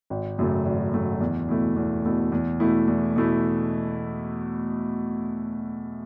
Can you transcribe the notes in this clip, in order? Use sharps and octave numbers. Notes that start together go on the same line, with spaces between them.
G#1
F#2 C#3 F#3 A3
G#1
F#2 C#3 F#3 A3
E2
B2 A3 E4
E2
B2 A3 E4
E2
B2 A3 E4
E2
B2 A3 E4